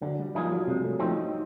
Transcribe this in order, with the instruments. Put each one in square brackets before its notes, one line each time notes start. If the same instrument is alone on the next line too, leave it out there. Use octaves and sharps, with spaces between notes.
[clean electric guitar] D3 [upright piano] F#3
[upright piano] G3
[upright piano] F3 [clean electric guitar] F#3 A#3 D#4 G#4
[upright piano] F#3
[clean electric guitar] C3 [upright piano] G#3
[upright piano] A3
[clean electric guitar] F3 A3 C4 [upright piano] D#4
[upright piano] D#4